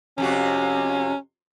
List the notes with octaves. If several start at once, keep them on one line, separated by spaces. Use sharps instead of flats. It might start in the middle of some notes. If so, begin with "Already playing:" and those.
F2 C3 C#4 F#4